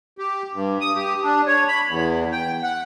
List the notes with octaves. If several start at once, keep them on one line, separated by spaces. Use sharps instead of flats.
G4
G2
D#6
G4
D4
C#5
B5
E2
G5
F#5